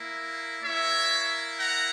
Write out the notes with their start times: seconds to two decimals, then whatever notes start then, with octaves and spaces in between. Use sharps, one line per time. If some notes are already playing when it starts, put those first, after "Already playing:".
Already playing: A#3 E4
0.63 A#3 E4 C#5 E5
1.58 F#5 A#5